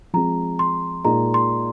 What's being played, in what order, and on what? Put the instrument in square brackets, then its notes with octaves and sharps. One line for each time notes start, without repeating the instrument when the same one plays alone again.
[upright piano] F3 G#3 C4 [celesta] A#5
[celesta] C6
[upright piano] A#2 G#3 D#4 [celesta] A#5
[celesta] C6